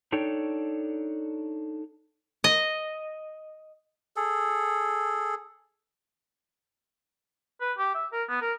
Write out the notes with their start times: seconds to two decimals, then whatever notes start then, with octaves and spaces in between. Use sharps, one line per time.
0.12 D4 D#4 A4 C#5 G5
2.44 D#5
4.16 G#4 A4
7.61 B4
7.78 G4
7.94 E5
8.12 A#4
8.29 B3
8.41 A#4